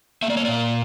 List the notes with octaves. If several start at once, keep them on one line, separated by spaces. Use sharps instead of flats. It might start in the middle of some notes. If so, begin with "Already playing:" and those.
A#3 E5
D5
C#5
A#2 D5